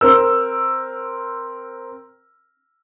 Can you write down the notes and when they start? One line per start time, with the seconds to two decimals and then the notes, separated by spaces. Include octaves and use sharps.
0.01 C4 A#4 E6